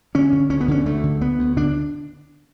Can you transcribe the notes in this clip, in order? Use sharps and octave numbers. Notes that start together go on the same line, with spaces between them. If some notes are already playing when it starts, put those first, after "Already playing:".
D3 C#4
D3
D2 C#4
B3
D3 C#4
D2 A3
D3
D2 B3
D2
D3 D4